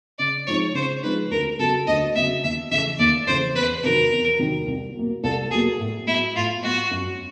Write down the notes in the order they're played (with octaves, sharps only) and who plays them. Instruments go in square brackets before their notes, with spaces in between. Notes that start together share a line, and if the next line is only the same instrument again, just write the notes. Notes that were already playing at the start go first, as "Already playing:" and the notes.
[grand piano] C#3 [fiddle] D5
[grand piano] F3 G#3 C4 D#4 [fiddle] C#5
[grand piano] C#3 [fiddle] C5
[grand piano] F3 G#3 C4 D#4 [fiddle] B4
[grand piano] D2 [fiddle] A#4
[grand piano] C#3 F#3 B3 [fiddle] A4
[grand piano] D2 [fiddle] D#5
[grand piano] C#3 F#3 B3 [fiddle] E5
[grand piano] D#2 [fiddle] E5
[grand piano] C#3 E3 A3 [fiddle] E5
[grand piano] D#2 [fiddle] D5
[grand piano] C#3 E3 A3 [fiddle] C5
[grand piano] E2 [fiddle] B4
[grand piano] C3 D#3 F#3 [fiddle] A#4
[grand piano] E2
C3 D#3 F#3
C2
B2 F#3 A#3
[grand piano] C2 [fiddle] A4
[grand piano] B2 F#3 A#3 [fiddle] G#4
[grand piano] A2
[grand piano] F#3 B3 [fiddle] E4
[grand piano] A2 [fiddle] F4
[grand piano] F#3 B3 [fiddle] F#4
[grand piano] F#2